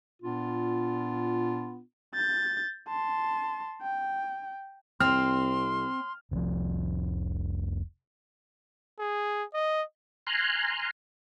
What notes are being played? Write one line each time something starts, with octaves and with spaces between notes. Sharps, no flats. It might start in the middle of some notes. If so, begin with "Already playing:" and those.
A#2 B3 D4 F4
G6 A6
A5 C6
G5
C2 C4 C6 F6
F1 C2 F2 F3
G#4
D#5
G#5 A#5 C6 F6 F#6